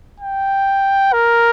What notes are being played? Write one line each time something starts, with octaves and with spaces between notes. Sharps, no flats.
G5
A#4